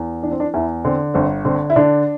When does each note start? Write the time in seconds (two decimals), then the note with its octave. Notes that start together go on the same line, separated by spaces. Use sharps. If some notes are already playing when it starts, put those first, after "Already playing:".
Already playing: E2
0.23 E3 D4
0.32 C4
0.40 D4
0.54 E2 E4
0.85 D3 C4
1.14 G1 C4
1.45 D3 C4
1.70 E4
1.76 D3 D4